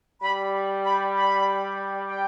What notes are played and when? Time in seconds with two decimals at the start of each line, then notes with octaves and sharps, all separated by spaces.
0.22 G3 B5
0.84 B5
1.16 B5
2.08 G5